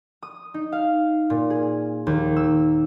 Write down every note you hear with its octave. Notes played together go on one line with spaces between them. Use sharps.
D#6
D#4
F5
A#2
G#4
D#2
E6